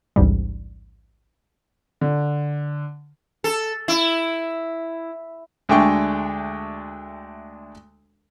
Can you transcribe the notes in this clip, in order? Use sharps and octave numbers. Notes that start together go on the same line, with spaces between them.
A1 D2 G#2 G3
D3
A4
E4
D2 G#3 A3 D4 G5 C#6